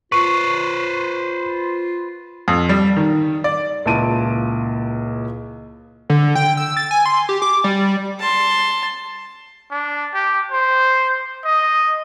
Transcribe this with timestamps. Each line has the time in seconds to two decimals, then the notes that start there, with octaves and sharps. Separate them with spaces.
0.12 F4 B4 C5 C#6
2.48 F2
2.69 G3
2.97 D#3
3.44 D5
3.86 C#2 A#2 E4 A5 D7 D#7
6.10 D3
6.35 G5
6.57 E6
6.77 A6
6.91 G#5
7.06 C6
7.29 G4
7.42 D6
7.64 G3
8.20 A5 C6
9.71 D4
10.14 G4
10.51 C5
11.45 D#5